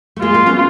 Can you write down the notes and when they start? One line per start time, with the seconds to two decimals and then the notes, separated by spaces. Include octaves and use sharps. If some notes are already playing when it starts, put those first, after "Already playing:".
0.16 A3
0.22 G#3 A#3 F4
0.34 A#3 C4
0.46 B3 C#4